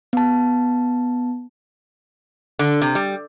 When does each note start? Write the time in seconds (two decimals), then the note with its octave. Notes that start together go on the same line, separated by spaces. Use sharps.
0.13 B3 A5
2.59 D3
2.82 C3
2.95 G3